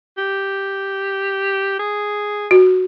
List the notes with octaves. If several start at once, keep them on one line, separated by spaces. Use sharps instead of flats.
G4
G#4
F#4